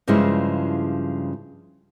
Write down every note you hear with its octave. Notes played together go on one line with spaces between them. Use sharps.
G2 C#3 F3 G#3 E4